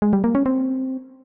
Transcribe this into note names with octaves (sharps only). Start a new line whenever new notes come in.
G#3
G3
A#3
C#4
C4